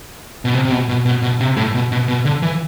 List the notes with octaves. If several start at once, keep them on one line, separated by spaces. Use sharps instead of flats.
B2
C3
C3
B2
B2
B2
B2
C3
A2
B2
B2
B2
D3
E3